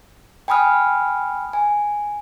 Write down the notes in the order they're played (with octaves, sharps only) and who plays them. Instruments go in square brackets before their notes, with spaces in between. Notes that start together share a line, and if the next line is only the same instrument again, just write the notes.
[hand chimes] G5 G#5 B5 D#6 F6
G#5